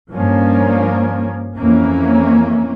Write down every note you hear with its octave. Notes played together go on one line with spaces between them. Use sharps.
G2 F3 A#3 C#4
F2 E3 A#3 C#4